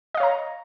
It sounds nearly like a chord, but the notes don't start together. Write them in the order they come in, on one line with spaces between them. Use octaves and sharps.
D#5 F5 C#5 A#5